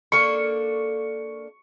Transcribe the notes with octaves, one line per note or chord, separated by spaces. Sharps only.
A#3 D4 A4 C#6